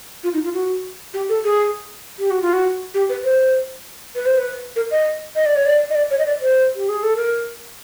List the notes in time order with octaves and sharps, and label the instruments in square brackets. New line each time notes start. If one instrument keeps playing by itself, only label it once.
[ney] F4
D#4
F4
F#4
G4
A4
G#4
G4
F#4
F4
F#4
G4
B4
C5
B4
C5
B4
A#4
D#5
D#5
D5
C#5
D5
D#5
D5
C#5
D#5
D5
C5
G4
G#4
A4
A#4